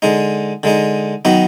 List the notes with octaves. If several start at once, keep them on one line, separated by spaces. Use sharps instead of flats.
D3 G#3 D#4
D3 G#3 D#4
D#3 F#3 B3 D#4